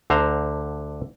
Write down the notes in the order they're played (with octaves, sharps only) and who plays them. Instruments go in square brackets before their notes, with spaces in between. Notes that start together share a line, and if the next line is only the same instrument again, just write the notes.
[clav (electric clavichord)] D2 D3 C5 A#5